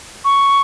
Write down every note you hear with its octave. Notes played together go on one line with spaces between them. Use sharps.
C#6